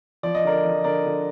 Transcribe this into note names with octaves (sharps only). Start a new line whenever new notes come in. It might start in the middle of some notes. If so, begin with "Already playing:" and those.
F3 D5
D#5
D3 A#4 D5
F3
D3 A#4 D5
D3